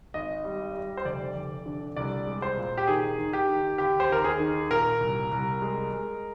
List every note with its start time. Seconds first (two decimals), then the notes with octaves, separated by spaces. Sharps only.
0.14 G#1 D#5
0.44 G3
0.75 G3
0.97 C5
1.05 F1 D5
1.35 F1
1.66 D3
1.97 C2 D5
2.27 G#3
2.42 C5
2.57 A#2
2.78 G4
2.87 D#3 G#4
3.18 D#3
3.33 G4
3.49 D#3
3.78 D#2 G4
4.00 C5
4.10 D#2 A#4
4.24 G#4
4.40 D#3
4.71 A#2 A#4
5.00 C2
5.31 C2
5.62 G#3
5.91 G#3